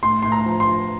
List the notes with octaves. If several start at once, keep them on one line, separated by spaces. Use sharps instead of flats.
A2 C6
A2 C6
A#5
F3
C6
F3